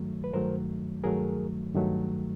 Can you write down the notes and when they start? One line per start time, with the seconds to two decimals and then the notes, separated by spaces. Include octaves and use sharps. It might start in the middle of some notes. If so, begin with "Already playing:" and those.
Already playing: G2 D#3 F#3 A3
0.24 B4
0.33 G2 D#3 F#3 A3 A#4 C5
1.04 G2 D#3 F#3 A3 G#4 A#4
1.74 G2 D#3 F#3 A3